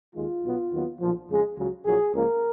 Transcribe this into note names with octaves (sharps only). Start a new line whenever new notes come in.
D#2 D#3 G#3 F4
B1 B2 F#3 B3
D#2 D#3 F#3 B3
B1 A#2 F3
F2 C#3 G#3
C#2 C#3 F#3
A#1 A#2 F#3 G#4
C#2 C#3 F3 A#3 A#4